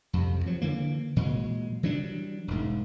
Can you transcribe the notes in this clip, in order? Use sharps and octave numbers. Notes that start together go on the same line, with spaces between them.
F2 C3
F3 F#3
D3 E3 A#3
A#2 E3 F#3 G#3
E3 F#3 G3 D4
E1 G#2